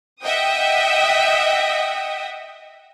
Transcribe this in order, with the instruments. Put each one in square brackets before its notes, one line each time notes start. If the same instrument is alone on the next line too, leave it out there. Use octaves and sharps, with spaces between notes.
[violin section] D#5 E5 F#5 G5 D#6